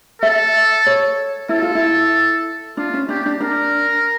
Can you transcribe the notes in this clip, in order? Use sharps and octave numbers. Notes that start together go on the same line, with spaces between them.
A4 E5
C#5
E4 A4
F4
E4
D4 F4
C#4
D4 G4
D4
D4 A#4